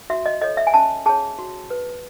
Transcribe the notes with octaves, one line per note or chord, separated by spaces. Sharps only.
F#4 E5
D#5
A4 C#5 D#5
E5
G#5
C#4 A5
G#4 C#5 A5
F#4
B4